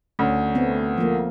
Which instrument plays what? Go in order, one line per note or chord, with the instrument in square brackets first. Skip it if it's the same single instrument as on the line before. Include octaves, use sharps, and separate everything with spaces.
[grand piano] D2 [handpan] C#4
[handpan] A3 B3 C4
F3 A#3